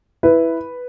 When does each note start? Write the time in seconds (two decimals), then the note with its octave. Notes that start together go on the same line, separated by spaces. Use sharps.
0.23 E4 B4